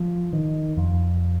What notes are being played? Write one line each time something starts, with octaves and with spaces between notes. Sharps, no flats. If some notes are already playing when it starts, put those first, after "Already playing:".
Already playing: F3
D#3
F2